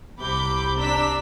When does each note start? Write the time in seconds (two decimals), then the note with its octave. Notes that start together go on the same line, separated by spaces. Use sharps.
0.19 C2 C3 B5 D6 G6
0.77 D4 A#5 E6 B6